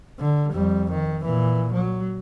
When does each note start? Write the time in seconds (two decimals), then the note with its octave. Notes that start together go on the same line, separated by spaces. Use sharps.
0.19 D3
0.52 F2 G3
0.91 D#3
1.24 A#2 E3
1.73 F#3